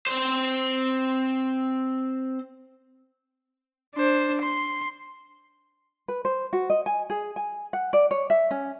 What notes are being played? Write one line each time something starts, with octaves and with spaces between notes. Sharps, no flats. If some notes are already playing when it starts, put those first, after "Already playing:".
C4 C5
D4 C5
C6
B4
C5
F#4
D#5
G#5
G#4
G#5
F#5
D5
C#5
E5
C#4